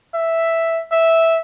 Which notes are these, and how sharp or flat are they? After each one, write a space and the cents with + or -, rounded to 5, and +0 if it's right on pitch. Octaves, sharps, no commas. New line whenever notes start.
E5 +0
E5 -10